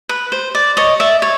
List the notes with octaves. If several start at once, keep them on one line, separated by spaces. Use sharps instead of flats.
B4
C5
D5
C#5 D#5
D5 E5
C#5